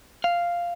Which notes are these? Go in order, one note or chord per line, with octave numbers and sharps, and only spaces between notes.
F5